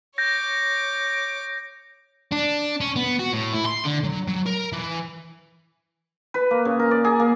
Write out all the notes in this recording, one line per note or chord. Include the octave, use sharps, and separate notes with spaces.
C#5 D6 G6 A#6
D4
C#4
B3
F#4
A2
E4
C6
D3
F#3
F#3
A#4
E3
B4
A#3
C#3
A#4
D5
G#4
A#3